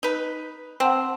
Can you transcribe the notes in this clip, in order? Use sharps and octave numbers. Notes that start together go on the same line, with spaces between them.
D#4 B4
C4 F#5 A5 E7